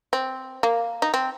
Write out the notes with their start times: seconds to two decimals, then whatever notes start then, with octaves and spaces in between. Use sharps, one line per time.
0.13 C4
0.63 A#3
1.02 D#4
1.14 C4